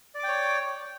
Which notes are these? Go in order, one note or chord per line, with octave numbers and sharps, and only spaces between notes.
C#5 D5 G5 D6